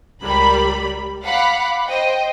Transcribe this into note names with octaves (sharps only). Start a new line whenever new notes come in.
C#2 G3 A#4 B5
F5 F#5 B5 D6
C5 D#5 G5